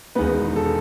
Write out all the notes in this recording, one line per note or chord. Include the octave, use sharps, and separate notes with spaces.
E1 E2 D#3 G#3 B3 B4
A4